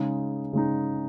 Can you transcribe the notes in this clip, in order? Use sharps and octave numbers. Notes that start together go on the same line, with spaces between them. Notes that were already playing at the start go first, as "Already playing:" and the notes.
Already playing: C#3 G#3 D#4
C#3 G#3 D#4